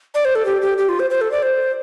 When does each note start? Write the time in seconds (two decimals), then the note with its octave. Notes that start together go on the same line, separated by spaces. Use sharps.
0.15 D5
0.25 C5
0.35 A4
0.46 G4
0.62 G4
0.78 G4
0.89 F4
0.99 C5
1.10 C5
1.21 A4
1.31 D5
1.42 C5